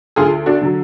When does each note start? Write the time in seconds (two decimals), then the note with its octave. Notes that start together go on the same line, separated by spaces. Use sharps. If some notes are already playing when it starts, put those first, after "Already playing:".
0.16 D2 F4 G#4
0.46 D4 F#4
0.62 D3 F#3